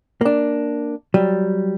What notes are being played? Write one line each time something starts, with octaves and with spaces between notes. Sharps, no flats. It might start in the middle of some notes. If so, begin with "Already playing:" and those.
A#3 D4
F#3 G3